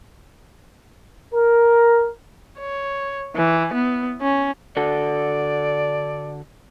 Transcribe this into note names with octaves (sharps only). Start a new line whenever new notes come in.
A#4
C#5
E3
B3
C#4
D3 F#4 A4 D5